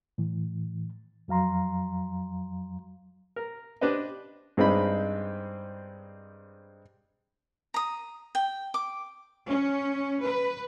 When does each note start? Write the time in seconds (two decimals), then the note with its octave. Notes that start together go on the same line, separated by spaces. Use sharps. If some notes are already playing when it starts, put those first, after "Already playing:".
0.18 A2 E3
1.28 F2 F#3 F5 A#5 C6
3.36 A#4
3.81 D4 G4 B4 C5 D#5
4.57 G2 G#3 C4 D#4 B5
7.74 A#5 D#6
8.35 G5
8.74 D6
9.49 C#4
10.23 B4